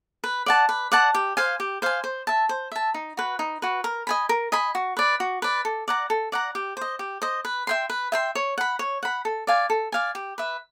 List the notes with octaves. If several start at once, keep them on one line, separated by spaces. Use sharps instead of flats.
B4
D5 F#5 A5
B4
D5 F#5 A5
G4
C5 F5 G#5
G4
C5 F5 G#5
C5
E5 A5
C5
E5 A5
D#4
F#4 B4
D#4
F#4 B4
A#4
D#5 G#5 B5
A#4
D#5 G#5 B5
F#4
B4 D5
F#4
B4 D5
A4
D5 F#5 A#5
A4
D5 F#5 A#5
G4
C5 D#5
G4
C5 D#5
B4
E5 G5 C6
B4
E5 G5 C6
C#5
F#5 B5
C#5
F#5 B5
A4
D5 F5 G#5
A4
D5 F5 G#5
G4
B4 E5